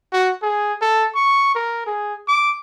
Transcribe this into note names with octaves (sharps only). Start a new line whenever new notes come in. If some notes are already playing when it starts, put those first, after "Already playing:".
F#4
G#4
A4
C#6
A#4
G#4
D6